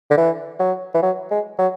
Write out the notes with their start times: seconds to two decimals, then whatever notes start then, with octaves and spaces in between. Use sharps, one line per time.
0.11 D3
0.18 E3
0.60 F#3
0.94 E3
1.02 F#3
1.31 G#3
1.59 F#3